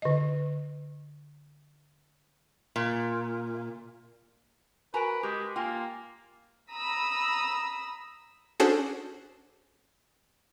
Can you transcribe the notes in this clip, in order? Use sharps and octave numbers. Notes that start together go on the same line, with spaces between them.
D3 D#5
A#2
F#4 A#4 B4 G#5 A#5 D7
G#3 G4
A#3 F4 G5 G#5
A#5 B5 D#6 E6
C#4 D4 F#4 G#4 A4 C5